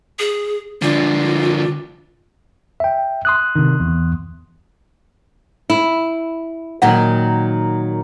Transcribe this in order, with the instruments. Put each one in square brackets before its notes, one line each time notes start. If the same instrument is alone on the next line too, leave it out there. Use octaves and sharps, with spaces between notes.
[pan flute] G#4
[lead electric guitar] D3 F3 [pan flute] F4
[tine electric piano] E5 G5
C6 D#6 F#6
[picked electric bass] C3 D#3
E2
[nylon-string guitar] E4
[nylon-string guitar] A#2 D#3 F#3 [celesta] F#5